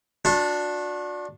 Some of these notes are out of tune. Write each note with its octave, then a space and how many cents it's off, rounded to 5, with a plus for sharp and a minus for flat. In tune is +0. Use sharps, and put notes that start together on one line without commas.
D4 +0 F#4 -40